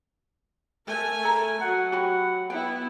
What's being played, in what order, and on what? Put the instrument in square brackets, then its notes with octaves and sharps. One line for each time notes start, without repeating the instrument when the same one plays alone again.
[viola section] A3 A#4 G#5
[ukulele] A4 E5 A#5
[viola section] F#3 [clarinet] F#5
[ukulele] F#4 G4 B5
[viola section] B3 E4 [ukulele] G5